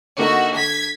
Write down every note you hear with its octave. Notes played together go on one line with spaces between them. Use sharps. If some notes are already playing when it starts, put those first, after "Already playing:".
D3 A#3 D#4 F#4 E5
D3 G#6 B6